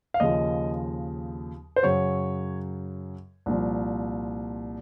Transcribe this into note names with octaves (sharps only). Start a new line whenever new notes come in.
F5
D#2 C#3 F3 D#5
C5
F#2 C#3 F#3 C#5
C2 A#2 F3